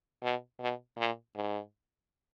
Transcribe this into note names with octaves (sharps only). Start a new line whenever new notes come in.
B2
B2
A#2
G#2